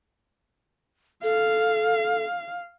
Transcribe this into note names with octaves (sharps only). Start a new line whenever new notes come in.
A4 F5